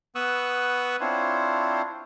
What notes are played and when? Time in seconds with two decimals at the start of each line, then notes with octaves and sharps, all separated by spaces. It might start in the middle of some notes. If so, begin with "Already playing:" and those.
0.15 B3 B4 C#6 D#6 E6 F#6
1.00 C4 D4 E4 F4 C5 C#5